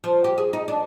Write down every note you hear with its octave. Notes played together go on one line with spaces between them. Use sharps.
F3
G4
G#4
D#4
D4